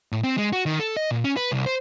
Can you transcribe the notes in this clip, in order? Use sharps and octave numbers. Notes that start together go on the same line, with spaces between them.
A2
C4
G#3
F#4
D#3
A4
D#5
A#2
C#4
B4
C2
C5